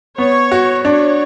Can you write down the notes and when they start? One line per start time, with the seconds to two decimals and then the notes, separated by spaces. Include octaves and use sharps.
0.18 B3 C#5
0.52 F#4
0.85 D4 C#5